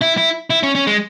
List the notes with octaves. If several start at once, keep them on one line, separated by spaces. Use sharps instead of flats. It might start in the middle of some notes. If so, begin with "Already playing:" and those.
E4
E4
E4
C#4
C#4
G#3